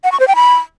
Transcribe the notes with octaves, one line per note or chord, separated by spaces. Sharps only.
F#5
C#6
C5
G5
B5